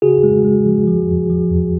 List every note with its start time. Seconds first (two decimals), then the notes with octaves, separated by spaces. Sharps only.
0.02 C#3 F#4 G#4
0.23 G#3
0.44 G#3
0.66 F3
0.87 F3
1.08 E2
1.30 F3
1.51 E2